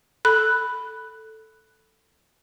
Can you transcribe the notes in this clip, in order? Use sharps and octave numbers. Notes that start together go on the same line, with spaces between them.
A4 B5 F#6